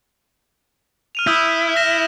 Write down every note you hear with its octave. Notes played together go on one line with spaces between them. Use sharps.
F6 D#7 F7
E4 D#6 E6 G6
F6 A#6 E7